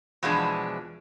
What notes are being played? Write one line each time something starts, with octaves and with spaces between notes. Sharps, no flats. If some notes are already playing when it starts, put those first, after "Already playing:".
E2 B2 E3 F3 G#3 D4